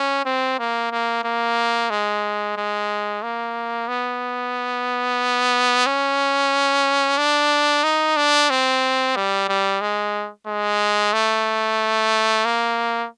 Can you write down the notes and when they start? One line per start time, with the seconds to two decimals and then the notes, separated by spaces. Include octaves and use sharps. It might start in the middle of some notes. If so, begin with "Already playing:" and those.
Already playing: C#4
0.25 C4
0.59 A#3
0.92 A#3
1.24 A#3
1.90 G#3
2.57 G#3
3.23 A#3
3.88 B3
5.86 C#4
7.18 D4
7.84 D#4
8.17 D4
8.50 C4
9.16 G3
9.49 G3
9.81 G#3
10.47 G#3
11.13 A3
12.45 A#3